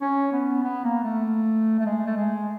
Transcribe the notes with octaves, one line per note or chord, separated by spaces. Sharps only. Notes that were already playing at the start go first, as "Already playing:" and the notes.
C#4
B3
B3
A#3
A3
A3
G#3
A3
G#3